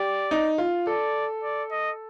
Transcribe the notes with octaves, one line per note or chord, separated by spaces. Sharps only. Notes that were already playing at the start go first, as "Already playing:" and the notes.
Already playing: G4 D5
D#4
F4
A4 D5
D5
D#5